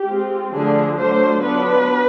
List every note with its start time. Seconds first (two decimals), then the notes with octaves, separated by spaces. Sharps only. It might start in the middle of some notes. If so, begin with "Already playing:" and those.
Already playing: G4
0.09 G#3 C4 F4
0.54 D3 F3 A3 D4 F4 G#4
0.98 D3 F#3 A3 D4 F4 C5
1.43 F#3 B3 D4 F4 B4